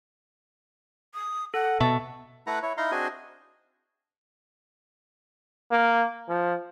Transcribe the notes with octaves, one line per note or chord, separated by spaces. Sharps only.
D#6
A4 F#5
B2 A4 E5 A5 C#6
A3 E4 B4 F#5 A#5
E4 C#5
D#4 E4 F5 A#5 C6
C4 D4 F#4 G#4 D#5 G#5
A#3
F3